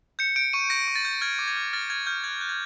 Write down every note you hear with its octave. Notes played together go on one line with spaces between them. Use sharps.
G6 C#7
G6 D7
C#6 D#7
G6 A#6
C#6
A6
G6
F6 G#6
D6
G#6
F6
F6 A6
F6 G#6
F6 G6
F#6 G#6
F#6
G#6